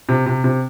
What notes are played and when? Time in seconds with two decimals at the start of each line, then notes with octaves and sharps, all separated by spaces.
0.09 C3
0.26 C3
0.44 C3